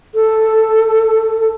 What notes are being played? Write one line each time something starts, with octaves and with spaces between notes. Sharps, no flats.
A4